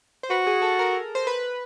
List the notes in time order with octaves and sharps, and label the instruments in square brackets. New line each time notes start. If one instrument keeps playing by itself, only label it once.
[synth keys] C5
[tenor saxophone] F#4 [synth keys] B4
[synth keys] G#4
A4
A#4
C5
B4